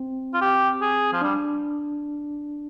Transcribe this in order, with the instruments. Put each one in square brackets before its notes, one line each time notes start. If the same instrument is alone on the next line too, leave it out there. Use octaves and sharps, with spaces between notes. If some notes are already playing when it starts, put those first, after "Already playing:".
Already playing: [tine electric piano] C4
[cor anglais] F4
G4
G#4
F3
[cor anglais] G3 [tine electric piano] D4